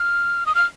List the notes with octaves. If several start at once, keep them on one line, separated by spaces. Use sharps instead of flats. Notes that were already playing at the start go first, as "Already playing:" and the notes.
Already playing: F6
D#6
F6